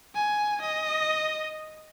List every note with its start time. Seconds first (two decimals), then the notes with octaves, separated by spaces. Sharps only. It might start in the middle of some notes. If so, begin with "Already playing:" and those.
0.15 G#5
0.61 D#5